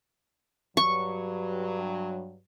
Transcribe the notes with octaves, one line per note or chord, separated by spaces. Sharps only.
G2 F#3 C#6